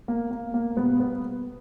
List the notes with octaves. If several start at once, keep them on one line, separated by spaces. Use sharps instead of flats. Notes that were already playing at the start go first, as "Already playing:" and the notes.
A#3
A#3
A#3
B2 G3 B3
B3